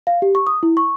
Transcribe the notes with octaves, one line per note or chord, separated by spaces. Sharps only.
F5
G4
C#6
D#6
E4
C#6